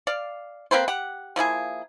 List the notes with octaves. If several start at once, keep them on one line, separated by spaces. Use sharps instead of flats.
D5 F5
A#3 C4 B4 C5
G4 F#5
F3 A#3 E4 G#4